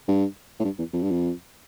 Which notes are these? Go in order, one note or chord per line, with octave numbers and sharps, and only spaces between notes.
G2
A2
G2
E2
F2
G2
F2